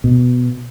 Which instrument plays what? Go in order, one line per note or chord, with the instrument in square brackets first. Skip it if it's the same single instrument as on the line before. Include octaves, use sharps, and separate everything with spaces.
[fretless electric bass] B2